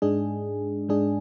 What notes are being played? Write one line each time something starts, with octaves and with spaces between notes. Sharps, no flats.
G#2 G#3 D4 G#4
G#2 G#3 D4 G#4